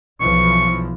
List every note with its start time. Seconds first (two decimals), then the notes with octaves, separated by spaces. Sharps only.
0.21 B1 E3 F3 C#6